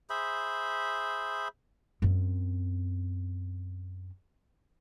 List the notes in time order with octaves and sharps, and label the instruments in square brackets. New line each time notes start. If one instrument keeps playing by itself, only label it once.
[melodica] G#4 C5 E5 B5
[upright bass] F#2 C4